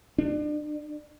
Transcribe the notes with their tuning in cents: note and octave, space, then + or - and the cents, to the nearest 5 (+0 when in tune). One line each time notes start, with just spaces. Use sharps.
D4 +35